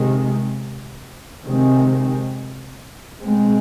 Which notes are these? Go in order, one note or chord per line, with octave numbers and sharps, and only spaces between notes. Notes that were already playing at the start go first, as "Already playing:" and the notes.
Already playing: C3 D#3 G#3
C3 D#3 G#3 C4
B2 G#3 C4